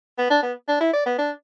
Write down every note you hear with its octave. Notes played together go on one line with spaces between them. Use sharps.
B3
D4
B3
D4
E4
D5
B3
D4